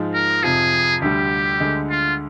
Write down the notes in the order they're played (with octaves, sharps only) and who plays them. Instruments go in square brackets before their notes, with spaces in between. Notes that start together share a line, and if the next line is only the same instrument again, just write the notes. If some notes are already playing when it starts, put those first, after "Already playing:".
Already playing: [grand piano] G#2 F3 G#3
[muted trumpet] A#4
[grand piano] F2 C3 F3 [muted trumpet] G#4
[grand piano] D2 D3 G3 [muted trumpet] G4
[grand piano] D2 D3 G#3
[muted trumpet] F4